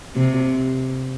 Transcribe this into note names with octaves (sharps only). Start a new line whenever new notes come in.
C3